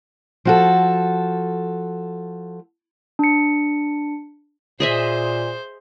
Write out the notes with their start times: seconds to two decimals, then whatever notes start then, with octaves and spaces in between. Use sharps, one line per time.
0.45 F3 F#4 A4
3.19 D4 C#7
4.80 A#2 G#4 C5 D#5 E5